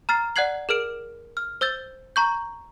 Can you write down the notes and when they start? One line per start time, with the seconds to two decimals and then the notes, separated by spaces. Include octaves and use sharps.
0.09 A#5 F6 A6 C7
0.36 D5 F#5 F#6 G#6 C7 F#7
0.69 G#4 A#4 F6 D7
1.37 F6
1.61 C5 E6 G6 A6
2.16 A#5 C#6 G6